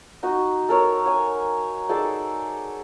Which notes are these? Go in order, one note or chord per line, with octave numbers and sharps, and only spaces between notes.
D#4 F#4 D#5
A4 A#4 C#5
C#5 G#5
D#4 G#4 A4 D5